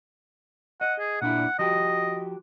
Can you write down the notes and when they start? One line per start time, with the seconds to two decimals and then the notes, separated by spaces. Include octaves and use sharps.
0.81 D#5 F#5
1.00 G#4
1.22 A#2 D4 E4 F#5
1.59 F3 F#4 G4 D#5